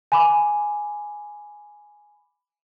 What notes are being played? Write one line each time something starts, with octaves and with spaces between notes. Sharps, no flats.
G#5 B5 D6